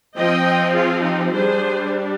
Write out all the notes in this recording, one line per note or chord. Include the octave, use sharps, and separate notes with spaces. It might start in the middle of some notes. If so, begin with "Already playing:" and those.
F3 C4 D#5 G5
F4 G#4
D#4 G4
G3 D4 G#4 C5